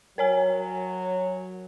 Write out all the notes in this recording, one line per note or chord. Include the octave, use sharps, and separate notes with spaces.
F#3 A#4 C#5 G#5